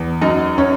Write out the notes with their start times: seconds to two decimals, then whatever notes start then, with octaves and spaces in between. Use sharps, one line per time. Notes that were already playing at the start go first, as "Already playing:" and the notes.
Already playing: E2
0.21 F#2 D#4 D#5
0.58 C#4 C#5